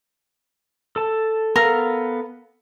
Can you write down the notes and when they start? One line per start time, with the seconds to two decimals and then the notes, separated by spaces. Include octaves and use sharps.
0.96 A4 A5
1.56 B3 A4 A#4 F5